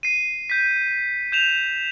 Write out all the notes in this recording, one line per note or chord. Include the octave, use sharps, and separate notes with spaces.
C7 D#7
G6 B6
G6 E7 F7